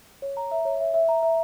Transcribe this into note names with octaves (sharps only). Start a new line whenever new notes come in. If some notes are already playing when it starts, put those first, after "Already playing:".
C#5
A#5
E5
C#5
E5
E5
A#5
E5